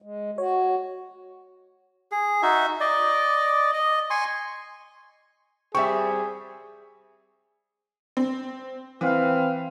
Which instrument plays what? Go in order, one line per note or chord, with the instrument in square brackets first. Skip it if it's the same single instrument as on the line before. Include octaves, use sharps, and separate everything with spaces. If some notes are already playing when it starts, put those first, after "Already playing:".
[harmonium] G#3
[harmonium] F#4 [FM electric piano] C#5
[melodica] G#4
D#4 F#4 E5
D5 D#5
D#5
G#5 C6 C#6
[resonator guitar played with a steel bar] G3 C4 [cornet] G#4 [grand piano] E5 G5 [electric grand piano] C#6
[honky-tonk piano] C4
[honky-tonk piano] E3 [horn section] C4 B4 F5